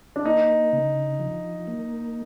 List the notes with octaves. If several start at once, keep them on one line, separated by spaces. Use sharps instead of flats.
D4
A#3 D#4
C#3
F3
A#3